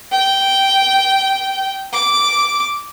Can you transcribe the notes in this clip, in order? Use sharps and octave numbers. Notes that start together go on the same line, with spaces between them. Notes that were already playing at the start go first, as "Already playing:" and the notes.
G5
D6